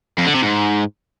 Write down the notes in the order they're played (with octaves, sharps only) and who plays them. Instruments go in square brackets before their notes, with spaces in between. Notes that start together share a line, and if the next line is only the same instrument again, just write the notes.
[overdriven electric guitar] F2
D3
C3
G#2